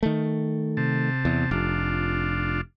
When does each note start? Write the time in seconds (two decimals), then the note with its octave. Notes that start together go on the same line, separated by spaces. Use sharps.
0.03 D#3 A3
0.77 C3 A5
1.25 E2
1.51 F1 D4 F4